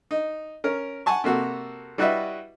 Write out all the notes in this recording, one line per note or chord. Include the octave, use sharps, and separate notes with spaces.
D#4
C#4 A#4
F#5 G#5 A5 C#6
C3 A#3 F#4 A4
G3 E4 F#4 B4 D#5 E5